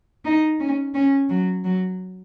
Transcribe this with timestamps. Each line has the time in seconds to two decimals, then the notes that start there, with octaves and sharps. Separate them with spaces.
0.25 D#4
0.60 C#4
0.94 C#4
1.29 F#3
1.64 F#3